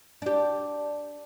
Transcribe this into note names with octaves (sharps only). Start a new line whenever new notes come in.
D4 G4